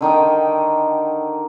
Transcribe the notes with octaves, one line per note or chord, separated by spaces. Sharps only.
D3 D#3 D#4 G5